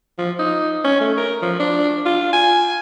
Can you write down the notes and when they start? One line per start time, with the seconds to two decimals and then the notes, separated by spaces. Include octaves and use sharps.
0.18 F3
0.39 D#4
0.84 C#4
1.01 A3
1.17 A#4
1.42 F3
1.59 D4
2.05 F4
2.33 G#5